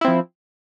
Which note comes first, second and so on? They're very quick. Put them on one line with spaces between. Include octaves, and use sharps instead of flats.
E4 C4 F3